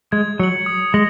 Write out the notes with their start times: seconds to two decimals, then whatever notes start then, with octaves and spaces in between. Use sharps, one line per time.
0.12 G#3 G#6
0.39 F#3 C#7 F#7
0.66 D#6
0.94 G#3 A#6 F#7